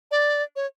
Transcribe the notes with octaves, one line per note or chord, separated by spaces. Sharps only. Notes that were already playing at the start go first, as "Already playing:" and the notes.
D5
C#5